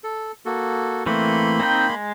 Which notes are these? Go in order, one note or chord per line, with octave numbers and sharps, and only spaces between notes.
A4
A#3 F#4 A4
E3 A3 A#3 C4 B5 C6
C4 D#4 G5
G#3